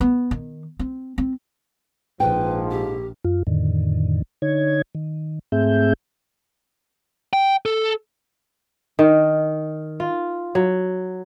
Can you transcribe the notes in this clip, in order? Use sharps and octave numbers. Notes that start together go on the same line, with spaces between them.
B3
D#3
C4
C4
A#1 G#2 F3 B4 G5
G4
F#2 F4
F2 A2 D3 D#3
D3 D#4 C#5 G#6
D#3
G#2 A3 C4 G#4 E5 G6
G5
A4
D#3
F4
F#3